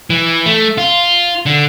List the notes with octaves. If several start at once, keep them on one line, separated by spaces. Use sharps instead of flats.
E3
A3
F4
D3